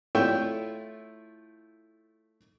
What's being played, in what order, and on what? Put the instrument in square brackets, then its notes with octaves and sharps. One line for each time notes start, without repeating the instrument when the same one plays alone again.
[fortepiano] A3 E4 F4 C#5 E5 G5